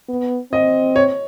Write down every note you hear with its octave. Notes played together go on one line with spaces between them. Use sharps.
B3
C4 D#5
C#5